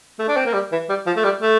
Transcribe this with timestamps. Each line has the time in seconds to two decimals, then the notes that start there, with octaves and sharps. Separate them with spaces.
0.19 A3
0.28 D4
0.37 C4
0.46 A#3
0.53 G3
0.72 E3
0.89 G3
1.06 F3
1.16 A3
1.24 G3
1.41 A3